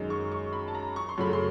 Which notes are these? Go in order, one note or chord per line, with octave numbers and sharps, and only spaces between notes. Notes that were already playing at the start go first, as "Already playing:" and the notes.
Already playing: F#2 D#3 G#3
C#6
C#6
B5
A5
A#5
C#6
C6
F#2 C#3 F#3 A3 B5
C6